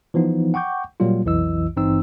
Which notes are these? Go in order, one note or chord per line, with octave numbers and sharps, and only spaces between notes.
E3 F3 B3 D#4
F#5 G5 C#6 D6 G6
A#2 F#3 G3 A#3 F4
B1 F2 E3 E4 D#5 E6
G#1 G2 E3 C4 D#4 E6